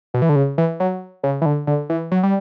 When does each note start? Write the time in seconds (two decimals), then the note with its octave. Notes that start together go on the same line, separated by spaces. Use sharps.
0.14 B2
0.22 E3
0.29 D3
0.36 C#3
0.58 E3
0.80 F#3
1.23 C#3
1.41 E3
1.46 D3
1.67 D3
1.90 E3
2.11 F#3
2.23 G3